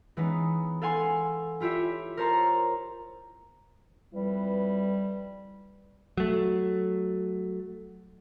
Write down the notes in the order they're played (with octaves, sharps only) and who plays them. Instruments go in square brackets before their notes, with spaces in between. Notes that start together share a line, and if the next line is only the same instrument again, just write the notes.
[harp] E3 G#3 B3 C#4 D#4
A4 F5 F#5 G#5 C6
E4 F4 G4 C#5 E5
A#4 C5 C#5 A5 A#5 C6
[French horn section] F2 E4 B4 [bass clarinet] G3
[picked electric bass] F#3 A3